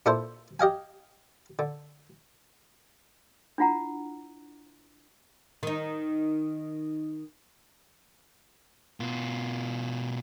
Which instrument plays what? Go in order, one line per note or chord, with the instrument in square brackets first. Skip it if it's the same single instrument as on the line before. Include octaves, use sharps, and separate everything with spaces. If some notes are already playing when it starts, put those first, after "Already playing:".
[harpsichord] A#2 D4 E4 A4 C5
G4 D#5 F5 G#5
D3
[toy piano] D4 E4 F4 F#5 A#5
[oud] D#3 D#4
[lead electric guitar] B2 F4